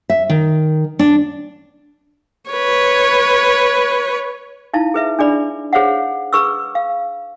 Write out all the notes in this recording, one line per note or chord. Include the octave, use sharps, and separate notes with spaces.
E5
D#3
D4
B4 C#5
D#4 E4 F5 A5
G#4 B4 E5
D4 G#4 D5 B5
G#4 C5 C#5 F5 F#5
G#4 B4 C#6 E6
F5